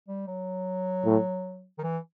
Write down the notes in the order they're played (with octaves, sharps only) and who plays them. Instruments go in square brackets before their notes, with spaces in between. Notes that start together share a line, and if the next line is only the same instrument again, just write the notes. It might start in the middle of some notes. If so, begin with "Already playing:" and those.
[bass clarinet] G3
F#3
[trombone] A2
[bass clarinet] D#3
E3